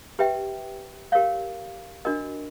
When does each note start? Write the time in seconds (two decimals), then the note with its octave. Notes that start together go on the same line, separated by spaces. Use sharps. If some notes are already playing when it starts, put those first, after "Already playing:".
0.19 G4 B4 E5 G5
1.12 G4 A#4 C#5 F5
2.05 D4 F#4 A#4 D#5